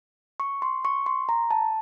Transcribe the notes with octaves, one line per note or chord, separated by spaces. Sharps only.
C#6
C6
C#6
C6
A#5
A5